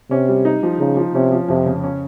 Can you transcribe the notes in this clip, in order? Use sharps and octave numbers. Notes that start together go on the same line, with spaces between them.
C3 C#4
G3
D#4
F3
C#3 D#4
F3
C3 C#4
F3
F2 C3
C#3
C#4